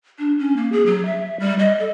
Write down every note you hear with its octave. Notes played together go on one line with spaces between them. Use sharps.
D4
C#4
A#3
G#4
F#3
E5
G3
D#5
A4